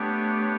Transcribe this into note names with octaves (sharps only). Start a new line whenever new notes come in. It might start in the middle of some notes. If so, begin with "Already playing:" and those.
Already playing: A3 B3 D4 G4 C#5